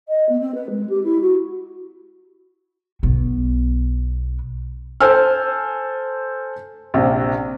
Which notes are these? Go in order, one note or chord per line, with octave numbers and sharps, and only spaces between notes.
D#5
B3
C4
B4
G#3
G4
E4
F#4
B1 B3
A4 C5 G#5 E6 F6
A#1 C3